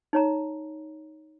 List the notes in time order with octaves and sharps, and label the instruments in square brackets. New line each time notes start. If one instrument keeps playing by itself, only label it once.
[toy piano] D#4 C#5 A#5